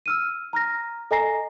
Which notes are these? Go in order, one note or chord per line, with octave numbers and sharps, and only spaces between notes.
E6 F6 D#7
A#5 F6 A#6
A4 D#5 G#5 A#5 A#6 C7